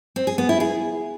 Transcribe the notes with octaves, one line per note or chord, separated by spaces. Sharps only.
C4
G#4
B3
E4
G#4